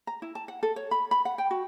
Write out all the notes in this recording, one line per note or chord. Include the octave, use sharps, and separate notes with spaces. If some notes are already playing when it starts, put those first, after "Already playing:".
A#5
E4
A5
F#5
A4
C#5
B5
B5
F#5
G5
F#4